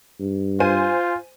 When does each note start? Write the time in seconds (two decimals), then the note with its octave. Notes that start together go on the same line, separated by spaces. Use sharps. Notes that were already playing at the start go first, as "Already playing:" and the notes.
0.20 G2
0.60 F4 C5 G#5 D#7